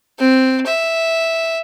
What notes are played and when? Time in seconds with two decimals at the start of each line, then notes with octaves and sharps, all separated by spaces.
0.19 C4
0.67 E5